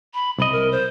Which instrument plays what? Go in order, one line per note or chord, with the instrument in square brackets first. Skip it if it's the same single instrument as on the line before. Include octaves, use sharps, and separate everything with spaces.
[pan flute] B5
[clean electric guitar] C2 D#5 [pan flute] B5
[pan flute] A#4
C5